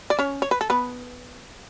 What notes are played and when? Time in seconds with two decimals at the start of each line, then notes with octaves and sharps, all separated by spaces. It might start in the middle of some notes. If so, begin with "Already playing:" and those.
0.10 D5
0.19 C#4 C#5
0.42 C#5
0.51 B4
0.61 A4
0.70 B3 B4